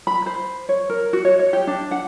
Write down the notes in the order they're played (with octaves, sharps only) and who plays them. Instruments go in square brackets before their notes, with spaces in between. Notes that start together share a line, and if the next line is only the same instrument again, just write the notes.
[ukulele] B5
C5
C#5
A#4
F#4
C#5
C#5
G4
D4
F#5